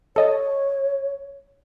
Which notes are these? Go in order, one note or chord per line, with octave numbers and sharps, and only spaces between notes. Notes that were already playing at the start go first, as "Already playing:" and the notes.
A4 C#5 D#5 A5